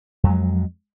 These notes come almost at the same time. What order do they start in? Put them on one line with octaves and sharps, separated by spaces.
F2 F#3 G#3